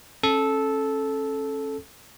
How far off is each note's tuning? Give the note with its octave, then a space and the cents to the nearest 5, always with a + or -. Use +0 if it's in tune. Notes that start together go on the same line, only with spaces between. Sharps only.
C#4 -30 A4 -10